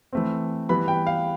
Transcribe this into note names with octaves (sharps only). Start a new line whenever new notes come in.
E3 A3 C4
E3 G3 B3 B5
G5
F5